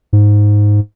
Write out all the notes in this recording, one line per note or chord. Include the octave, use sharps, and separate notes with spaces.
G#2